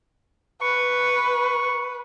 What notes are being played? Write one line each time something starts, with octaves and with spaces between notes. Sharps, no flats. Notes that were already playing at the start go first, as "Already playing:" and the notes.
B4 C#6